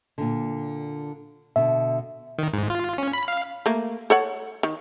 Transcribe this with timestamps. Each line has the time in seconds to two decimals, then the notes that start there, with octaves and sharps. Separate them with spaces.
0.18 A#2 D3
1.56 B2 D3 E5
2.38 D#3
2.53 G#2
2.70 F4
2.98 C#4
3.13 B5
3.28 F5
3.66 A3 A#3
4.10 A4 C#5 F#5
4.63 D#3